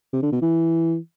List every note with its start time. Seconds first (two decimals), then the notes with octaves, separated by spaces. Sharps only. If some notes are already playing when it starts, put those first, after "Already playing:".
0.13 C3
0.23 D3
0.32 B2
0.42 E3